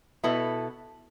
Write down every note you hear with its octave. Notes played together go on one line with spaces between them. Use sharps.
B2 B3 E4 A4